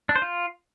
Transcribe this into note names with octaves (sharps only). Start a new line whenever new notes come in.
D4
C5
F4